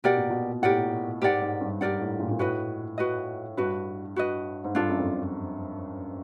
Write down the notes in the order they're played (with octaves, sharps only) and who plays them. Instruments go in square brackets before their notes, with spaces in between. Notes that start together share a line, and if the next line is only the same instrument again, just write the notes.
[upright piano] B2 [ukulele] G4 A#4 D5 F#5
[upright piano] A#2
B2
[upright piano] A2 [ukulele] G4 A#4 D5 F#5
[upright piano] G#2 [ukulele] G4 A#4 D5 F#5
[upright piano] G#2
G2
[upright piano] G2 [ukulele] G4 A#4 D5 F#5
[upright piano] A2
A#2
A#2
[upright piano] A2 [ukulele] F#4 B4 D#5
[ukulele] F#4 B4 D#5
[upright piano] G2 [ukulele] F#4 B4 D#5
[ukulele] F#4 B4 D#5
[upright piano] G#2
[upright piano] G2 [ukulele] D4 F4 A4
[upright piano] F#2
F2